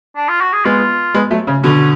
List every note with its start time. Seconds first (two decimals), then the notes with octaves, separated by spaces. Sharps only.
0.16 D4
0.28 F4
0.41 F#4
0.53 G#4
0.65 G#3 B3 F4
1.14 G#3 B3
1.31 F#3 A3
1.47 C#3
1.63 B2 D3 C#4